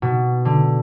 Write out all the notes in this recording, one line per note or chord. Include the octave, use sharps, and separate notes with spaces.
B2
D3